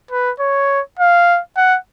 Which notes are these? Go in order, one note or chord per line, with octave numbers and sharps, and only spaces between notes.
B4
C#5
F5
F#5